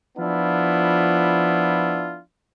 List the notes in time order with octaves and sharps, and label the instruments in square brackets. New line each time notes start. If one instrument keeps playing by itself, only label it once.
[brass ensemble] F3 B3 D4 E4 F4